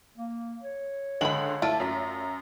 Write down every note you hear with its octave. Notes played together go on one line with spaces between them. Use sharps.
A#3
C#5
C#2 D3 G#3 B5 F#7
A3 E4 F4 D5 A5
F#2 A#5 B6